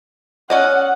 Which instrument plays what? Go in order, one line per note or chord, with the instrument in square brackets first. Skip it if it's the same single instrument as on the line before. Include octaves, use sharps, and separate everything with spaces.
[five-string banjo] C#4 D5 D#5 [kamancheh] F#5